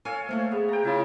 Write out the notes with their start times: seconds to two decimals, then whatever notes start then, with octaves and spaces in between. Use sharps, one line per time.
0.05 A4 C#5 F5 G#5
0.29 A3 A#3 C5 F#5
0.52 B3 G#4
0.69 G5 A#5
0.85 C#3 E4 F4 A5